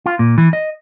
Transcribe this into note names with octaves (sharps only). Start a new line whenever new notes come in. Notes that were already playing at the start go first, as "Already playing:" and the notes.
F4
A#2
E3
D#5